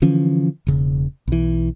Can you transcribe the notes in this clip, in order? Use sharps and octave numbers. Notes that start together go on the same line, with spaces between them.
D3 E3 F3 C#4
E1 C#3
B1 E3